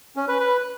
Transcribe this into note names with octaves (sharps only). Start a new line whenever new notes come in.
C#4
B4
B4